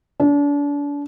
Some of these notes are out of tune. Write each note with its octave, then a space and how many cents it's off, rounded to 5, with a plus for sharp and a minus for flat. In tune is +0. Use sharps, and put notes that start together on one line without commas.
D4 -35